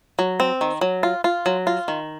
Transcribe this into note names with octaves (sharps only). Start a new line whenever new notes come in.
F#3
C4
D#3
F#3
F4
F4
F#3
F4
D#3